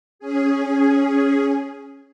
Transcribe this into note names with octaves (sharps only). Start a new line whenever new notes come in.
C#4 G#4